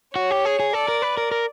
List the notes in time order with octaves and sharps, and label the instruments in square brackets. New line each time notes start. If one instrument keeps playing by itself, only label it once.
[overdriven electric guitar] F#4 [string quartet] C#5
[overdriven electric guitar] G4
G#4
G#4
[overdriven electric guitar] A4 [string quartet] D5
[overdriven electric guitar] A#4
B4
A#4
A#4